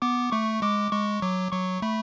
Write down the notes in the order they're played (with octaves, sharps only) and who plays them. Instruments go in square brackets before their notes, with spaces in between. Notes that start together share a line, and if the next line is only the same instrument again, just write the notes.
[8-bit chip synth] B3 [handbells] D6
[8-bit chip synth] A3 [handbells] C#6
[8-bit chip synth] G#3 [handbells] D6
[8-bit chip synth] G#3 [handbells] C#6
[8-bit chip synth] F#3 [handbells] D6
[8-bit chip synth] F#3 [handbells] C#6
[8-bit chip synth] A3 [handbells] B5